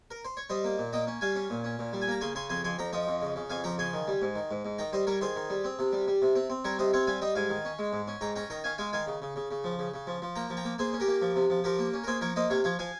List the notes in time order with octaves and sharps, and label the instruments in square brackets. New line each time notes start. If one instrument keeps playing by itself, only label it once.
[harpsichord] A#4
C5
C#5
G3 C5 D#5
A#3
A#2
A#3 D#5 G5
C#4
G3 F5 G#5
C#4
A#2
C#4
A#2
G3
G#5
A#3 A#5
C#3 G#5 C6
C#3 G#5 C6
F2 G#5 C6
F2 G#5 C6
F2 G5 A#5
F3 D#5 G5
F2
C#3
C#3
F2 F5 G#5
F3 G5 A#5
C#3 G#5 C6
D#3
G3
G#2
D#3
G#2
G#2
D#3 G5 A#5
G3 C5 D#5
G3 A#4 C#5
D#3 G#4 C5
D#3
G3
C4
C3
G3
G3
C3
C4
C4
G3 A#4 C#5
C3 C5 D#5
C4 C#5 F5
G3 F5 G#5
G3 D#5 G5
G#2 F5 G#5
D#3
C#4
G#3
G#2
C#4
G#2 G5 A#5
C#4 G5 A#5
D#3 G5 A#5
C#4 F5 G#5
G#3 F5 G#5
D#3 F5 G#5
C#3
C#3
C#3
C#3
F3
C#3
C#3
F3
F3
A#3 G5 A#5
F3
G5 A#5
A#3
A#3 G#4 C5
C#4
G4 A#4
A#3
F3
C3
F3
F3 G4 A#4
A#3
C#4
A#4
A#3 G#4 C5
F3 A#4 C#5
A#3 C5 D#5
C3 C#5 F5
F3 C#5 F5
F3 F5 G#5